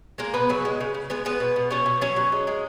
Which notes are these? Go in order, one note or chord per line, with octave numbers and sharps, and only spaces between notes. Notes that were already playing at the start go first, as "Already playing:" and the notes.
G#3 A#3 A#4
B2 B3 B4
C#3 F#3 F#4
G#3
C#3
C#3
G#3 B3 B4
G#3 B3 B4
B2
B2
B2 C#4 C#5
B2
F#3 C#4 C#5
F#3
G#3
G#3